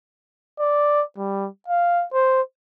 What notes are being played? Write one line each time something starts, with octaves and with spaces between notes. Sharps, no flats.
D5
G3
F5
C5